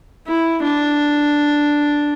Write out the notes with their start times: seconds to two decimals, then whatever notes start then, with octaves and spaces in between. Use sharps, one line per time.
0.27 E4
0.64 D4